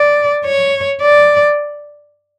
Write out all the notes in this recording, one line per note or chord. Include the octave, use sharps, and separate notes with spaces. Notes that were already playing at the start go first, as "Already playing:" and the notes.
Already playing: D5
C#5
D5